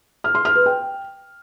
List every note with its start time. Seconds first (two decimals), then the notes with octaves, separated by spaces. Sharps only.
0.24 F6
0.35 C6
0.45 F6
0.55 B4
0.66 G5